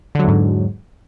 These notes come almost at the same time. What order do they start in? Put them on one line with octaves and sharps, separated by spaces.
D3 F#3 E2 G#2